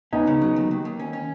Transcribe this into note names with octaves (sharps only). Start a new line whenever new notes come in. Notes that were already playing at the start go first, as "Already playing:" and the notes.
B3 C#4 D#4
C#3
F#3
D#2
D#2
D#2
C#4
C#4